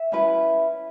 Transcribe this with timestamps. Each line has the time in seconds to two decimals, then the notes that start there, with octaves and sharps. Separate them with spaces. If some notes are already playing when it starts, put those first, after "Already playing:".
Already playing: E5
0.12 C#4 E4 B4